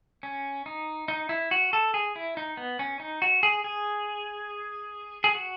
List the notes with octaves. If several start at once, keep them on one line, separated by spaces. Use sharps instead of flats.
C#4
D#4
D#4
E4
F#4
A4
G#4
E4
D#4
B3
C#4
D#4
F#4
G#4
G#4
G#4
F#4